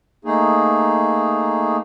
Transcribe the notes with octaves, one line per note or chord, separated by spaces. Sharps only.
A3 A#3 D#4 G#4